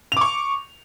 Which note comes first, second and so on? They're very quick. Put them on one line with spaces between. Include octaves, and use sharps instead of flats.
F7 D6 C#6